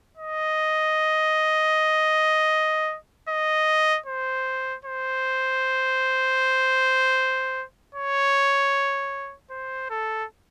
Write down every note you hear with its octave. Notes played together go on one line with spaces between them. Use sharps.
D#5
D#5
C5
C5
C#5
C5
A4